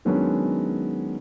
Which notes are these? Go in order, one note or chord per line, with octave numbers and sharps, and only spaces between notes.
D#3 F#3 G#3 B3 C#4 D4